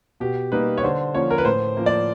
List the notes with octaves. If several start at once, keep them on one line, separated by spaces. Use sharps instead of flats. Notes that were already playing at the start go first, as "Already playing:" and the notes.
B2 G4
G3 A#3 D#4 B4
C#5
D3 C5
F3 A#3 C#4 C#5
A#4
B4
A2 C5
F3 A#3
D5